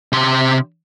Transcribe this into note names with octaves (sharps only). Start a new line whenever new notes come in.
C3 C6